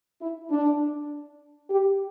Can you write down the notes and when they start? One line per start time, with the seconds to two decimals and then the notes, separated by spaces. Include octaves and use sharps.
0.21 E4
0.51 D4
1.70 G4